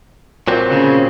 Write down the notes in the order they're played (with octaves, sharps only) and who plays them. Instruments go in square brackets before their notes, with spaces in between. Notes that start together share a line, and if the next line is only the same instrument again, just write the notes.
[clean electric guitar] A#2 F#3 C4
[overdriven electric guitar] C#3